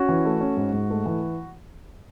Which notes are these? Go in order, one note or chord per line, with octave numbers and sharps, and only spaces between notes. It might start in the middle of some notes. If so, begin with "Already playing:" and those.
Already playing: C#4 F#4
E3
A3
C#4
G#2
G#2
A3
E3